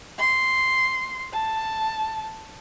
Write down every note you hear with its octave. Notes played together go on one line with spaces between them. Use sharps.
C6
A5